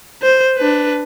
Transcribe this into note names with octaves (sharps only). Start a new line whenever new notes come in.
C5
D4 B4